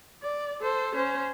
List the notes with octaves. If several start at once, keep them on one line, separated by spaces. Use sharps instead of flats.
D5
A4 C5
C#4 C5